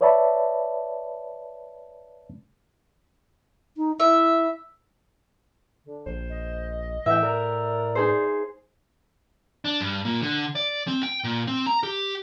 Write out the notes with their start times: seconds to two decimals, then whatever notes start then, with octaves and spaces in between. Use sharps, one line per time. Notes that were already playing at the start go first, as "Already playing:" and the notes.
0.01 B4 C#5 D5 E5 A5 B5
3.77 D#4
4.00 E4 E5
5.85 D3
6.06 A#1 C5
6.30 D#5
7.06 A2 E3 E5 G5
7.22 A#4 D5
7.95 D#4 G#4 C5
9.65 D4
9.81 G2
10.05 A#2
10.21 D3
10.55 D5
10.87 C4
11.03 G5
11.24 A#2
11.47 C4
11.67 A#5
11.83 G4